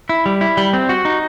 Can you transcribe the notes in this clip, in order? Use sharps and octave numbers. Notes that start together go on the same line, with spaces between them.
E4
G3
E4
G3
C4
F#4
D#4